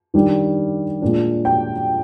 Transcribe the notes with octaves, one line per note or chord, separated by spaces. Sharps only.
D#3 G3 D4
A#2 G#3 D4
G5